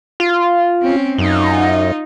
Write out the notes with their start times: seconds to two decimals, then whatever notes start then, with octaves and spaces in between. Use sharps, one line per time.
0.20 F4
0.82 C4 C#4
1.18 F#2 D#4 F4